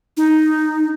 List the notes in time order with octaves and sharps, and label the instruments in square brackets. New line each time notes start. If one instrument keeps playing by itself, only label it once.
[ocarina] D#4